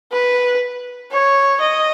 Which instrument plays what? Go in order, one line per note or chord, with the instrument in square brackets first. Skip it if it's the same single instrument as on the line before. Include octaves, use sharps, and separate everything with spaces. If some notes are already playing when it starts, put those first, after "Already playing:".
[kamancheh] B4
C#5
D#5